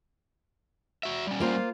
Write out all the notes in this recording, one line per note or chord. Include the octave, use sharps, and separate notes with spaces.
F#4 E5
G3 C#4
A#3 F4 C5